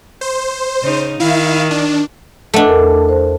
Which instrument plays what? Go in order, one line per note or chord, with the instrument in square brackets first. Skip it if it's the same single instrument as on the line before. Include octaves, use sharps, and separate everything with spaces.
[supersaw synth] C5
[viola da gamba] C#3 D#4
[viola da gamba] D#3 [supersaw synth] E4 F5
[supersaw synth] D4
[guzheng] A3 D4 [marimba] D#5 F#5
[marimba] E2 A#4
C5